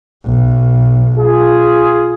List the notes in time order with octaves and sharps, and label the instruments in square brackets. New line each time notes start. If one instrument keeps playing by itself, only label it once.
[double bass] B1
[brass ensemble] F4 G#4